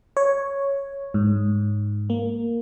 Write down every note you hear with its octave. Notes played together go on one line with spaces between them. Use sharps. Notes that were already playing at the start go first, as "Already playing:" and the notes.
C#5
G#2
A#3